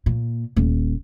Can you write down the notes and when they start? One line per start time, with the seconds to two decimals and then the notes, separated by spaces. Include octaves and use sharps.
0.06 A#2
0.56 D#1